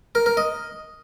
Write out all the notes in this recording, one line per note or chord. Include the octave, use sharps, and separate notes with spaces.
A#4
A#4
D#5